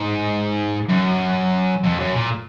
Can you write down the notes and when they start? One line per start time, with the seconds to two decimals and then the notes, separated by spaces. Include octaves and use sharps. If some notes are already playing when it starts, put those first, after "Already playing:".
Already playing: G#2
0.89 F#2
1.84 F2
1.99 F#2
2.14 A#2